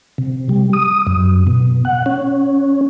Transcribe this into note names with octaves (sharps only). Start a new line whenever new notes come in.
C3
G3
D#6
F#2
B2
F#5
C#4